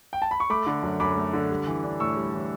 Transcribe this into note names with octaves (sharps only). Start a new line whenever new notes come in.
G5
A5
B5
C#6
A3 B5 D6
D3
F#2
F#2 B5 D6
A3
D3
G3
E3
D4
A2 C#6 E6
G3
E3